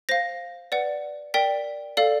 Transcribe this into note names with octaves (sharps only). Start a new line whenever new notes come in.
C5 F5 A#6
B4 D5 F#5
A#4 D5 G5 B6
A4 D5 F5